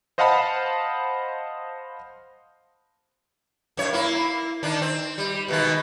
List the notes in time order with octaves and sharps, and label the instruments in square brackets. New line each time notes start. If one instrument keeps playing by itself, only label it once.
[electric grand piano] C5 D#5 F5 F#5 A5 B5
[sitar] F#2 C#5
A#3 E4
D#3 D4
C4
G3
B2 D#3 G#3